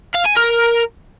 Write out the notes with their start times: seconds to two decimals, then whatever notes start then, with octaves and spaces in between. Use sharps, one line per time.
0.15 F5
0.26 G#5
0.37 A#4